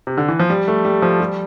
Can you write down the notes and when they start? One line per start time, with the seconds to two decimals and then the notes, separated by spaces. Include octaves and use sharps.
0.07 C3
0.17 D3
0.28 E3
0.40 F3
0.50 G3
0.68 A3
0.85 G3
1.02 F3
1.20 G3